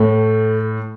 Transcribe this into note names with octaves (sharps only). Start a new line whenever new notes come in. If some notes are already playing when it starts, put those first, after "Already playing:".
Already playing: A2 A3